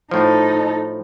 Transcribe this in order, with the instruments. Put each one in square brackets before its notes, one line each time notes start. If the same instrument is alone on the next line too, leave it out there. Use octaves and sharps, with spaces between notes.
[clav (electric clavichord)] A2 F3 [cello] D#4 A4